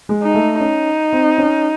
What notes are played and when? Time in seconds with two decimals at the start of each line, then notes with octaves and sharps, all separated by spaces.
0.09 G#3
0.23 D#4
0.35 A3
0.60 C#4 D#4
1.13 C4
1.38 C#4